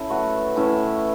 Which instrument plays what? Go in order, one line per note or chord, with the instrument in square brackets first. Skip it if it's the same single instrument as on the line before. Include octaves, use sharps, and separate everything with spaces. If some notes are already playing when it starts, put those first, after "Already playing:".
Already playing: [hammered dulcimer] C#4 E4 A4
F#3 A3 F#4 B4
A2 E3 C#4 E4